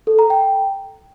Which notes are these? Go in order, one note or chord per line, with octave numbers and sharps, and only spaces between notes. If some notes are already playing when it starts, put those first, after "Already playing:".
A4
A#5
G5